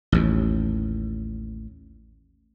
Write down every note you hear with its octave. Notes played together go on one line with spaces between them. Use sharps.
A1 D#2